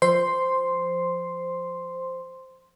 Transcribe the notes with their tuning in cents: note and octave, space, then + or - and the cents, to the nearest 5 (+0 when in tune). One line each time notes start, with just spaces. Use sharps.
F3 +0 C5 -5 C6 +0